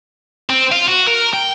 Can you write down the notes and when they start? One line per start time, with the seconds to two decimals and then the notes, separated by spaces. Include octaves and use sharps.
0.50 C4
0.72 F4
0.88 F#4
1.07 A#4
1.34 G5